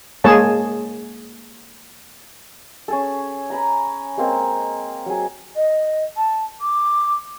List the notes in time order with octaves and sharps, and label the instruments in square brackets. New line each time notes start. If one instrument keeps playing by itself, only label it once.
[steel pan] G#3 A#3 G#4 C#5 A5
[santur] C#4 G#4 A4
A#5 B5 D#6
G#3 A#3 C4 F5
F#3 G#4
[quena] D#5
A5
D6